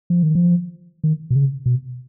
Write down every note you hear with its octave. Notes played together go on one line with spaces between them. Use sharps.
F3
D#3
F3
D#3
B2
C#3
B2